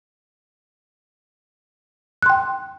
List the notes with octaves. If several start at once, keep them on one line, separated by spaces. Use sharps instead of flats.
G5 C6 F#6